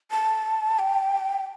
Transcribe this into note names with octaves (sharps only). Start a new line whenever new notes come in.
A5
G5